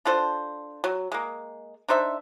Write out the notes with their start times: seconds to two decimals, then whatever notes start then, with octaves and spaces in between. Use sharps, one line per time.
0.05 D4 F4 A4 C5
0.84 F#3
1.12 G#3 A#3
1.88 D4 D#4 C5 E5